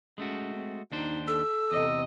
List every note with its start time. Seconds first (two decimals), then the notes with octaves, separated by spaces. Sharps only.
0.18 G#3 A3 C#4 F#4
0.55 C4
0.92 D#2 D4 D#4 C5
1.28 A4 E6
1.72 E2 C3 D#5